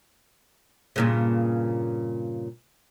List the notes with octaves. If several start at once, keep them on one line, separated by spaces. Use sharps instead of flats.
G2 A#2 C#3